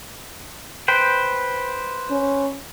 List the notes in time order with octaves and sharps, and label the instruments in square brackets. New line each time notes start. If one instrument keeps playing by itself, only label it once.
[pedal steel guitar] B4 C5 G5
[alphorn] C#4